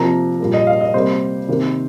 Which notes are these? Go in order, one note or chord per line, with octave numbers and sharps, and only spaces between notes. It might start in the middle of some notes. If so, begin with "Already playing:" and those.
Already playing: C3 F3 A#3 A#5
A#2 G3 A#3
D#5
F5
D#5
C3 G3 A#3 C5
C3 D#3 A#3